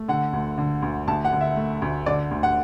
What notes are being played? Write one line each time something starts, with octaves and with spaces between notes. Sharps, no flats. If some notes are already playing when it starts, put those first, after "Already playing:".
Already playing: A3
D3 F#5
D2
D3
D2
D2 A5
F#5
D3
E5
A3
D2
D3 D5
D2
F#5